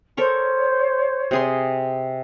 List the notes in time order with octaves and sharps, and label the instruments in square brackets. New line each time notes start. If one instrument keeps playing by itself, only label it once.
[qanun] A4 A#4 C#6 [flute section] C5 C#5
[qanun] C3 G#4 C6